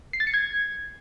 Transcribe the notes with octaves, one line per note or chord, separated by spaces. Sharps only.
C7
A6
C#7
G#6